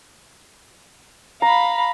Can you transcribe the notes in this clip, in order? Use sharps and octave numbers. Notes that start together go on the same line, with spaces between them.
F5 A#5 B5